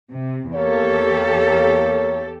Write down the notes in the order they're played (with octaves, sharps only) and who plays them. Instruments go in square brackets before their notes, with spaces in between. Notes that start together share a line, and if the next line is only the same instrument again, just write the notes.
[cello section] C3
[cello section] E2 G4 A4 [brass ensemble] A#3 C#5